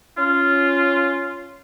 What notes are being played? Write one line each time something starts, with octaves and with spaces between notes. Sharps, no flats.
C#4 F4